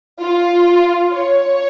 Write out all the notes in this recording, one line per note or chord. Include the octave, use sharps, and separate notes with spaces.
F4
C#5